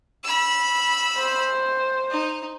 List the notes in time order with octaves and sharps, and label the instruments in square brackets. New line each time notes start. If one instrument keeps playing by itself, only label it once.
[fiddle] B5 E6
[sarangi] C5
[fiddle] D#4